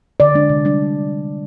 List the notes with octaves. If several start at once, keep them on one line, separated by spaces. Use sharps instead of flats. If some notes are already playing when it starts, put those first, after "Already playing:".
D3 D5
G#3 D4
C3
G3 D4